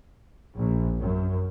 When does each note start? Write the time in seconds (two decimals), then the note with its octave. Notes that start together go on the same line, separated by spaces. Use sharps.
0.54 A#1
0.98 F#2